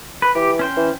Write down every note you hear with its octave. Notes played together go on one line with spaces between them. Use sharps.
B4
E3 G4
C#4 C5 G5
E3